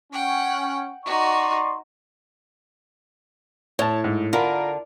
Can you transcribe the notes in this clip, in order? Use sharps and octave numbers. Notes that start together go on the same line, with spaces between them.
C#4 F#5 G5
D#4 F#4 D5 C6 C#6
A2 C#5 A5
G#2
D3 F4 A#4 B5